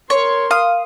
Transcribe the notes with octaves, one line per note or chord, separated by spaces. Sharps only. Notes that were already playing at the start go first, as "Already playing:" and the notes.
A#4 C#5 C6
F5 D#6